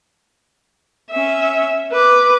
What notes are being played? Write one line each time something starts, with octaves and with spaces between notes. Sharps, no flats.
C#4 E5
B4 D6